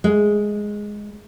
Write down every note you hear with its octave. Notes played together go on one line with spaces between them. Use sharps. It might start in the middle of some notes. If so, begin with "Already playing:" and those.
G#3